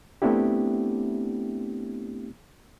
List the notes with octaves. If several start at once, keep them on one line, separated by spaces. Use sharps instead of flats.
A3 B3 C4 D4 E4 G4